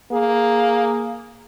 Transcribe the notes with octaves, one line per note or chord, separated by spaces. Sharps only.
A#3 G#4